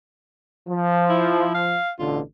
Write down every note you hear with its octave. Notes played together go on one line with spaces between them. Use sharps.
F3
E4
F5
A1 B2 D3 F4